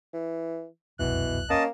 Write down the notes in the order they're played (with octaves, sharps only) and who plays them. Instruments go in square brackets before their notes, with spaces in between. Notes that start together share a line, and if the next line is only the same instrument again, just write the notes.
[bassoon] E3
[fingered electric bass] F1 C2 F#2 [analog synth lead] B2 [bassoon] E3 [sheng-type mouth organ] F#6
[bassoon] A#3 [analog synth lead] C#4 [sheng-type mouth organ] D#5 A5